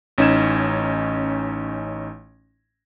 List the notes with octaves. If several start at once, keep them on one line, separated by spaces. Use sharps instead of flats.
A1 C#4 D#4 G#6 E7